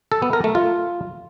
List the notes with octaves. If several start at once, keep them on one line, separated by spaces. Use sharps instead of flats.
A4
B3
A#4
A3
F4